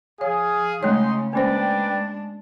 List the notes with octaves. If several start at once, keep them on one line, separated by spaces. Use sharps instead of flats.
F3 G#4 C#5 F5
C#3 G#3 A3 C#4 D#4 C#5 C6
G#3 A#3 C#4 D4 B4 C5 D5 G5